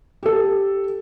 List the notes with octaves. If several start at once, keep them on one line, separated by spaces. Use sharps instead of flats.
G4 A4